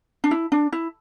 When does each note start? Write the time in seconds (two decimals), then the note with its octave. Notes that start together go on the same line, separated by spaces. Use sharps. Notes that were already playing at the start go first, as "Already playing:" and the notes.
0.24 D4
0.31 E4
0.52 D4
0.72 E4